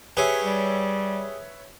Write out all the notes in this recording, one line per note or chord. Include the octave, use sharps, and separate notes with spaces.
G4 G#4 B4 C#5 E5
G3